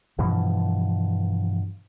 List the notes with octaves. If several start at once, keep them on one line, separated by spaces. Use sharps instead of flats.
G2 B2 E3 F3